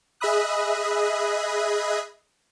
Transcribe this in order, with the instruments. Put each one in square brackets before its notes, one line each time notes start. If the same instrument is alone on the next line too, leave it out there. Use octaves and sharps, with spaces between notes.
[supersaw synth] G#4 D#5 E5 B5 D#6 F#6